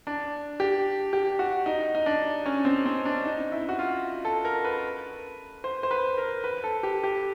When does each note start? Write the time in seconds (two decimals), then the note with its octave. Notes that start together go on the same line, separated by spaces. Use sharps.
0.07 D4
0.60 G4
1.13 G4
1.39 F#4
1.66 D#4
1.95 D#4
2.06 D4
2.46 C#4
2.65 C4
2.86 C4
3.05 D4
3.25 D#4
3.52 E4
3.69 F#4
3.79 F4
4.25 A4
4.45 A#4
4.64 B4
5.64 C5
5.83 C5
5.91 B4
6.17 A#4
6.44 B4
6.64 A4
6.83 G4
7.04 G4